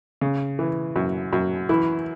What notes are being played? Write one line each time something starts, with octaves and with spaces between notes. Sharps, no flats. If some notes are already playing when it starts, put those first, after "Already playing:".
C#3
E3
F#2
F#2
E3 E4